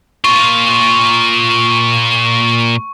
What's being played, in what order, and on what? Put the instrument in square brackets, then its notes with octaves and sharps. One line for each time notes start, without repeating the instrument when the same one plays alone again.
[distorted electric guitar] A#2 F4 [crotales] C#6